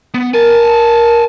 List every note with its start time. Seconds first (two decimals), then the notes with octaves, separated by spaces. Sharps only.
0.14 B3
0.33 A#4 G#5 A5